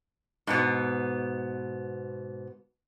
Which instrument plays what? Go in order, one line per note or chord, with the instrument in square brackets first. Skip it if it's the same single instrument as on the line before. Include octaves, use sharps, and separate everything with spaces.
[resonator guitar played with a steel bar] G#2 B2 B3